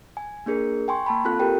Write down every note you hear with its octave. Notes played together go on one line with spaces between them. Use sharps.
G#5
A#3 D4 G#4 A#4
G5 G#5 C6 C#6
A#3 A5 B5
C4 F4 A4 F#6
G4 A4 A#4 G5